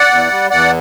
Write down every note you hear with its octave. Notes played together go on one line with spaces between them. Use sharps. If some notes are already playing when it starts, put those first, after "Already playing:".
Already playing: D5 F#5
E2
G3
E2 D5 F#5